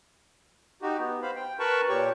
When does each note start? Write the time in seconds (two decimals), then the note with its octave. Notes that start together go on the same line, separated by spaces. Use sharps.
0.82 D#4 F#4 G4
0.99 B3
1.23 C5 F5 B5
1.36 G5
1.60 A#4 B4 A5 B5 C#6
1.89 A#2 G4 C#5 C#6